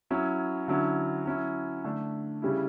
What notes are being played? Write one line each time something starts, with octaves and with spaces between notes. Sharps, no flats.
F#3 C#4 E4
D3 F#3 C#4 E4
F#3 C#4 E4
D3 A3 D4
C#3 G3 C#4 E4